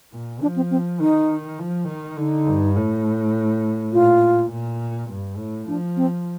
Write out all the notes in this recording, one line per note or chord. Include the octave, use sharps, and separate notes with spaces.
A#2
F3 D4
C4
C4
D#3 D#4
F3
D#3
D3 D#4
G2
A2
A#2 F4
A#2
G2
A2
F3 D4
C4